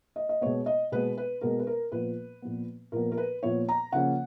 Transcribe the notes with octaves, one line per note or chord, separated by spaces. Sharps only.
D#5
D#5
B2 G#3 B3 C#5
D#5
B2 G#3 B3 B4
B4
B2 G#3 B3 A#4
B4
A#4
A#2 F3 B3 B4
A#2 F3 B3
A#2 F3 B3 A#4
A#4
B4
A#2 F3 B3 C#5
A#5
C#3 F3 A#3 C#4 F#5